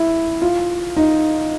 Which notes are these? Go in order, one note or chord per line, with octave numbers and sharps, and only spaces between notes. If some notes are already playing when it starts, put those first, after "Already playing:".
Already playing: E4
F4
D#4